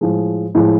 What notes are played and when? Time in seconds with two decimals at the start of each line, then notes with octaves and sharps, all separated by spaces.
0.01 A2 F3 G#3
0.55 A2 F3 G#3